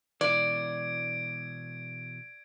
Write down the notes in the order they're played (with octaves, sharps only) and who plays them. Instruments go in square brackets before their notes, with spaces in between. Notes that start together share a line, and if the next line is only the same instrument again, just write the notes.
[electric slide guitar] B2 E3 [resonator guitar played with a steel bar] D5 [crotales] G#6 D7